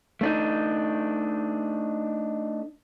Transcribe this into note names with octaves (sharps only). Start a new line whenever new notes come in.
A3 D4 D#4